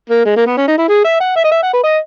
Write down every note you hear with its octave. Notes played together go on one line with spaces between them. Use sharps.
A#3
G#3
A#3
B3
C#4
D#4
E4
G#4
E5
F#5
E5
D#5
E5
F#5
B4
D#5